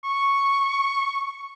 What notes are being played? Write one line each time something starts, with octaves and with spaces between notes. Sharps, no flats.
C#6